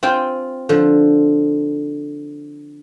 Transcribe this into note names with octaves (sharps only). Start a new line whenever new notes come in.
C4 F4 G5 G#5
D3 F3